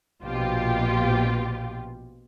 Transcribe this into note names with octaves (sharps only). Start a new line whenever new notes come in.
A#1 B2 F4 G4